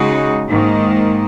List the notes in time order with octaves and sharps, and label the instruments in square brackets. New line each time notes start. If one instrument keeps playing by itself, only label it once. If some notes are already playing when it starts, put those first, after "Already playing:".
Already playing: [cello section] C#3 G#3 D#4 F#4
G#2 D#3 A#3